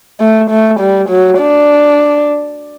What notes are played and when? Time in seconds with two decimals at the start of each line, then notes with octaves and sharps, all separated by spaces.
0.20 A3
0.50 A3
0.80 G3
1.09 F#3
1.39 D4